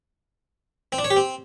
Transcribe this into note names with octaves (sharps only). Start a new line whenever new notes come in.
C4
D4
C#5
G4
C4